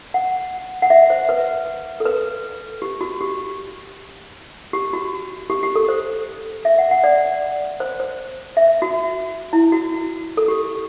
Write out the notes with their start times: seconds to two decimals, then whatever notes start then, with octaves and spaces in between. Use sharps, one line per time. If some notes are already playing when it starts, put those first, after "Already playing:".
0.14 F#5
0.82 F#5
0.90 E5
1.10 C5
1.29 B4
2.00 A4
2.05 B4
2.82 G4
3.01 F#4
3.21 G4
4.73 G4
4.93 F#4
5.50 G4
5.63 G4
5.76 A4
5.89 C5
6.65 E5
6.78 F#5
6.91 F#5
7.04 D5
7.80 C5
8.00 C5
8.57 E5
8.82 F#4
9.53 E4
9.72 F#4
10.37 A4
10.48 G4